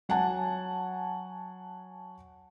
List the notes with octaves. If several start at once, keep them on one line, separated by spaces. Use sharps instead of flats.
F#3 F#5 G#5 A5